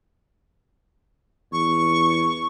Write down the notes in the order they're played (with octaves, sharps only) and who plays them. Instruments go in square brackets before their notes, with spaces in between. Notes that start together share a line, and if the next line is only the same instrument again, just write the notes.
[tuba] E2 [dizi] C#6